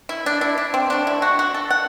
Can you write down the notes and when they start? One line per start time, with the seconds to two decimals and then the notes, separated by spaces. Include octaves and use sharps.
0.09 E4
0.26 D4
0.41 E4
0.58 D4
0.74 C4
0.90 D3 A3 D4
1.07 E4
1.22 F#4
1.39 F#4
1.54 A4
1.70 F#5